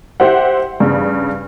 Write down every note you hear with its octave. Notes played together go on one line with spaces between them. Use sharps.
G4 C5 E5 F#5
G2 C#3